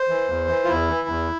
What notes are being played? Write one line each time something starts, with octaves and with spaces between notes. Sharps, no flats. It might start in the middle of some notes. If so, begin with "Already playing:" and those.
Already playing: C5
E3
E2
E3
F4
E2 E4
E3
E2